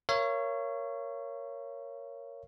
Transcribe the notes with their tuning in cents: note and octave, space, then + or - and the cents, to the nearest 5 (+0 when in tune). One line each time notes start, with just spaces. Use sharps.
A#4 +0 C#5 +0 F5 -45